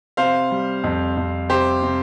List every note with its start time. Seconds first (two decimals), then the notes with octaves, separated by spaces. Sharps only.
0.17 C3 C5 F5
0.51 G3
0.84 F2
1.17 F2
1.49 C3 G4 C5
1.82 C3